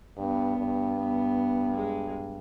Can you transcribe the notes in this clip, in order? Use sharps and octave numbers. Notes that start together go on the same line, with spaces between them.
G2 B3
G2
B3
G#3